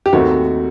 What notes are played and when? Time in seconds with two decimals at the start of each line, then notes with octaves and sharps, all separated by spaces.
0.06 G4
0.13 D#2 D#3 A3 C4 F#4